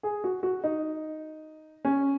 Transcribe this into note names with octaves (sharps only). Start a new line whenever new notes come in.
G#4
F#4
F#4
D#4
C#4